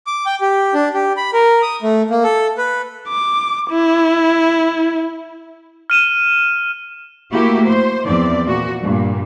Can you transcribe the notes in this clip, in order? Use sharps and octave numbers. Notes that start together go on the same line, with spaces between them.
D6
G5
G4
D4
G4
B5
A#4
D#6
A3
A#3
A4
B4
D6
E4
F6 D#7 E7
A3 A#3 E4 F#4 G4
C5
E2 F3 C4 D5
A#2 F#4
G2 A#2